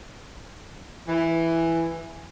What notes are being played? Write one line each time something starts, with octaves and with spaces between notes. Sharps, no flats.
E3